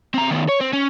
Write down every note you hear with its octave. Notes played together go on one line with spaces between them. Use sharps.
C4 A#5
D#3 B3
C#5
C4
C#4